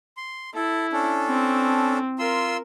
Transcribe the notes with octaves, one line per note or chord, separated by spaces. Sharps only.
C6
E4 A4
C#4 D4 A4
C4
F4 A#4 C6 E6